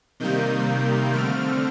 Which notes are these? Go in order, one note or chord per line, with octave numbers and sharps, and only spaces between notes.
C3 D#3 G3 A#3 G6
D3 A3 C4 F6